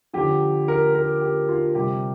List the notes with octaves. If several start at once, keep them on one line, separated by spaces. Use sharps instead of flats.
D3 F3 G4
A#4
A#4
G4
F4
C3 G3 G4